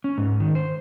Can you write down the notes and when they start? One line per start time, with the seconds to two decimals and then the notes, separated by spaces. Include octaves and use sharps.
0.04 C#4
0.18 G#2
0.40 D#3
0.55 C5